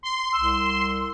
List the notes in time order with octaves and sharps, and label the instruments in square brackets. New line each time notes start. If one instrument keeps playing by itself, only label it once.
[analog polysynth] C6
[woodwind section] C2 E6